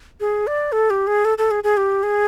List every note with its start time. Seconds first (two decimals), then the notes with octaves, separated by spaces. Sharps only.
0.20 G#4
0.47 D5
0.72 A4
0.90 G4
1.07 G#4
1.25 A4
1.38 A4
1.51 G#4
1.64 G#4
1.77 G4
2.03 G#4